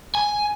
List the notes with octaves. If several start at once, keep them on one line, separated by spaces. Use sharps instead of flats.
G#5